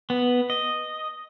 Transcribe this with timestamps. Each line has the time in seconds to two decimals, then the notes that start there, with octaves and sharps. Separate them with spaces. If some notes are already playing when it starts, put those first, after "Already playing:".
0.10 B3
0.50 D#5